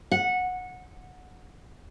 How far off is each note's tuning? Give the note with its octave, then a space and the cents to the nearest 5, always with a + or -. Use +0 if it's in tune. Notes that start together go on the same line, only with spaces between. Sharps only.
F#5 -15